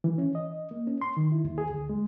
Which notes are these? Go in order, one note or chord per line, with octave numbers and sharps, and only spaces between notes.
E3
C#4
D#5
A#3
C#4
C6
D#3
E4
D#2
G#4
D2
G#3